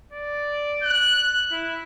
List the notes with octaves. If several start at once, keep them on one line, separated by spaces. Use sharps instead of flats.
D5
F#6
E4